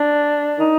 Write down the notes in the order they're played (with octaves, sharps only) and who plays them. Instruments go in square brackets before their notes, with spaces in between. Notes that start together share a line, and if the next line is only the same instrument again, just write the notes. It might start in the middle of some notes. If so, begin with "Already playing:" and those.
Already playing: [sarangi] D4
[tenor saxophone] D#4